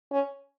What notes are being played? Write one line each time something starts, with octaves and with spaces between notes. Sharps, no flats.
C#4